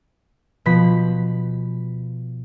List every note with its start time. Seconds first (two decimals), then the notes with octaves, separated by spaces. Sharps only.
0.66 B2 F3 B5 B6